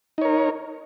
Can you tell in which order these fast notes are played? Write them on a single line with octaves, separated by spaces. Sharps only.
D#4 C#5 A#4